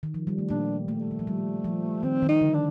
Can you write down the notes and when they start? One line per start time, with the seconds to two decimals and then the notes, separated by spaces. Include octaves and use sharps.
0.03 D#3
0.14 F3
0.27 G3
0.38 A3
0.50 A#2 A#3 D4
0.88 G3 A3
1.01 A3
1.11 D#3
1.19 F3
1.27 G3
1.64 F3
2.03 D#3 C4
2.22 D#3
2.28 D#4
2.42 D3
2.54 D4